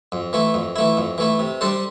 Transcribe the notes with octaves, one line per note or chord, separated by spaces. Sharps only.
F2
E3 A3 E4
F2
E3 A3 E4
F2
E3 A3 E4
C3
G3 D4 A4 C5